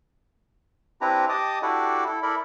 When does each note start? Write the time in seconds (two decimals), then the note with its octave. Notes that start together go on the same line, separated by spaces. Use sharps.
1.01 C4 D4 E4 G4 B4 A#5
1.29 G4 D#5 A5 D6 D#6
1.62 D4 E4 F#4 G4 A4 D5
2.07 E4 A4
2.23 E4 A4 A#4 D5 B5